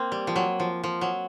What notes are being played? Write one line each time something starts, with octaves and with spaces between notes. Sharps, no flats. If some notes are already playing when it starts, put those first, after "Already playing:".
Already playing: A#3 C4
G3
F3
F#3
F3
F3
F#3